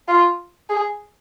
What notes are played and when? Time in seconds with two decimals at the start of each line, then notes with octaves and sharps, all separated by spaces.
0.08 F4
0.69 G#4